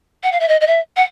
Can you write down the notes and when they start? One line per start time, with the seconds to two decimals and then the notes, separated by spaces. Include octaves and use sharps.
0.24 F#5
0.32 F5
0.40 E5
0.48 D#5
0.61 D#5
0.67 E5
0.96 F#5